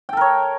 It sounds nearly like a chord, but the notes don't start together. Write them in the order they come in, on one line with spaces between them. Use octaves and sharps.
G5 A4 A#4 C#5